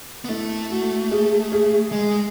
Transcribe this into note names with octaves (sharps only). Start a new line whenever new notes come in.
B3
A3 E4
F#4
G#4
G#4
G#3